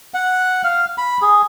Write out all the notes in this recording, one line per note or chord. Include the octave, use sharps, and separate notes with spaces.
F#5
F5
B5
G#4